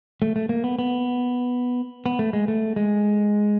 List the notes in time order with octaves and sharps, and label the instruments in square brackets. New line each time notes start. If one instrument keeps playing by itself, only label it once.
[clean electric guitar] A3
A3
A#3
B3
B3
B3
A3
G#3
A3
G#3